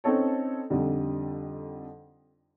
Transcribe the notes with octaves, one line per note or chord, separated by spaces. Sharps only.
C4 C#4 D#4 A4 C#5
F2 D3 G3 D#4